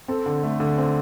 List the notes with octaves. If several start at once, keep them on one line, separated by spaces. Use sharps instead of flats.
C4 A4
D3
A3
D3
C4